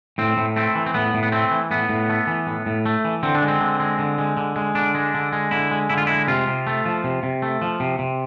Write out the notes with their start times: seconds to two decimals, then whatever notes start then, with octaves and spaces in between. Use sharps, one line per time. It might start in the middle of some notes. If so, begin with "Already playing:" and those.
0.18 A2 C4
0.37 A2
0.56 A3 C4
0.75 E3
0.86 C4
0.94 A2 B3
1.14 A2
1.23 B3
1.32 A3 C4
1.51 E3
1.71 A2 B3
1.89 A2
2.09 A3
2.27 E3
2.47 A2
2.66 A2
2.86 A3
3.05 E3
3.23 D3 C4
3.35 D4
3.42 G#3
3.48 C4
3.61 D3
3.80 G#3
3.99 D3
4.18 G#3
4.37 D3
4.56 G#3
4.75 D3 D4
4.95 G#3
5.14 D3
5.33 G#3
5.51 D3 E4
5.71 G#3
5.90 D3 E4
5.98 F4
6.07 G#3 E4
6.28 C3 F4
6.47 C3
6.67 A3
6.86 F3
7.04 C3
7.23 C3
7.42 A3
7.62 F3
7.80 C3
7.99 C3